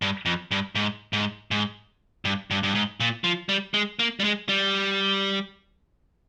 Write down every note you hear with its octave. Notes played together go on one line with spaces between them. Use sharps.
G2
F2
G2
G#2
G#2
G#2
G2
G2
G2
G#2
A#2
F3
G3
G#3
A#3
G3
G#3
G3